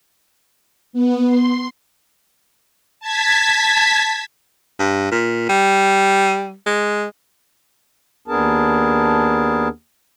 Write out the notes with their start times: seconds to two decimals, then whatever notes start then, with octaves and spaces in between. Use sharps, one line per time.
0.93 B3
1.27 C6
3.00 A5 G#6 B6
4.79 G2
5.11 A#2
5.49 G3
6.66 G#3
8.28 D#2 B3 D4 G#4 A#4 A5